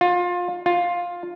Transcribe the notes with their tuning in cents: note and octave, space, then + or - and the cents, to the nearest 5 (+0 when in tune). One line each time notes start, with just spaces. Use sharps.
F4 +25
F4 +10